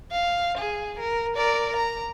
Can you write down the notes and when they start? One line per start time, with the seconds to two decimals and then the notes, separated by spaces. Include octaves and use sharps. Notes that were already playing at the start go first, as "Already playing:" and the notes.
0.11 F5
0.58 G#4
0.99 A#4
1.37 A#4 D5
1.76 A#5